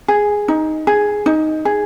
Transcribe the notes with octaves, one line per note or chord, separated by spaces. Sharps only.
G#4
D#4
G#4
D#4
G#4